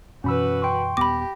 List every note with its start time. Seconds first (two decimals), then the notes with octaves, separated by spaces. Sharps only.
0.24 F#2 B2 E3 C#4 F#4 B4 B5 E6
0.62 G5 C6 C#6
0.97 D#1 B3 G4 B5 D6 A#6